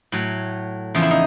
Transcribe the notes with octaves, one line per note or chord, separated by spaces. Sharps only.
A2 F#3
E2 C#3 F3 F4
E4
D#4